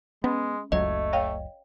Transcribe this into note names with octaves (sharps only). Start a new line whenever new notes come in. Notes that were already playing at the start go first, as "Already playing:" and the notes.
G#3 B3 C#4
F#1 C#2 F#3 A3 D#5
C#5 F5 G5